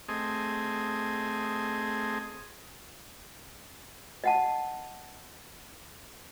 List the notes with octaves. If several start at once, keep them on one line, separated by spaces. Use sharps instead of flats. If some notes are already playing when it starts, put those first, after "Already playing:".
A3 C4 G#4 D#5
D#5 F#5 A5